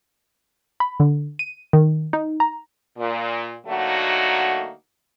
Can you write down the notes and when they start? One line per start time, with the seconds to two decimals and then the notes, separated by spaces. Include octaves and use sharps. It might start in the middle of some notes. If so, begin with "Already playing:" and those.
0.80 B5
1.00 D3
1.39 D#7
1.73 D#3
2.13 D#4
2.40 A#5
2.98 A#2
3.67 D3 F#3 A3 A#3 D#4 F#4